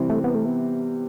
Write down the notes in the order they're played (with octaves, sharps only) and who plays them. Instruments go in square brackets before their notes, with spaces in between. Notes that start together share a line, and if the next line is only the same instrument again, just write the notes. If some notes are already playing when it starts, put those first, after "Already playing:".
Already playing: [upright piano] C3 E3 G3 C4
[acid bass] A3
B3
A3
B3